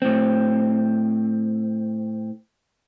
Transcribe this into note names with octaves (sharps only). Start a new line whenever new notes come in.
A2 C4